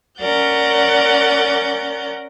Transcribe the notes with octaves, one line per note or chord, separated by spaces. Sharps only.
C#4 A#4 D5 F#5 G6 A6